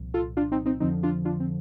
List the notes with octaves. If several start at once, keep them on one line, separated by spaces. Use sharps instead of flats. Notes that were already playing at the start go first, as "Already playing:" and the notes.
Already playing: C2 A#2 F3
F4 A4
D4 F4
C4 D#4
C4 D#4
F2 D3 F3 C4 D#4
D4 F4
D4 F4
C4